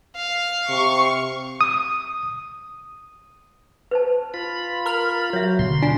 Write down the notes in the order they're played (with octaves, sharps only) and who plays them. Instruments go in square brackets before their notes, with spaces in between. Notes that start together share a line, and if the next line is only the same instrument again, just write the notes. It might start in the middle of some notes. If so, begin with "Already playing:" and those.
[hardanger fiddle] F5
[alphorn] C3 [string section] C#6
[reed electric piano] D#6
[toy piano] B4 C5 A5
[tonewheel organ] F4 B5
[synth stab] A#4 F6
[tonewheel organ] F#3 [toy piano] C#5 E5
[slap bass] B2 D3 [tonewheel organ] C6
[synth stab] D4 [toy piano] F4 G#5